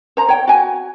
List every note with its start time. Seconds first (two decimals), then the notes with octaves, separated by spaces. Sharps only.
0.17 C5 A#5
0.29 C#5 G5
0.47 F#4 G#5